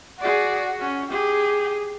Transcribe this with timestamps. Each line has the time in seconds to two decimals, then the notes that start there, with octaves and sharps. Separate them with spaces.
0.20 F#4 G#4 D5
0.80 C#4
1.10 G4 G#4